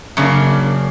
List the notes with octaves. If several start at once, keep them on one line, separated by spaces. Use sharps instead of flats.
F#2 C#3 A#3 D4